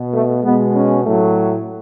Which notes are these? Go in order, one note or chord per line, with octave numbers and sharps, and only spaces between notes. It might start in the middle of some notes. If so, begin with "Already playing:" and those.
Already playing: B2
A3
B2 G#3 B3
C#4
A2 F#3 A3